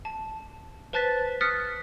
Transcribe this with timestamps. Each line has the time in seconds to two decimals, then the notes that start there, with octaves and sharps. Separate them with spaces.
0.05 A5
0.93 B4 C5 A5 F#6 A6 B6
1.41 D#6 F6 F#6 A6 B6 C#7